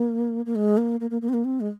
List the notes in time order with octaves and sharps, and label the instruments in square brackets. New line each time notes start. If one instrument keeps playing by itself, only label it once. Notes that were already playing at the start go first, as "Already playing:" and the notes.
Already playing: [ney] A#3
A#3
G#3
A#3
A#3
A#3
A#3
C4
A#3
C4
G#3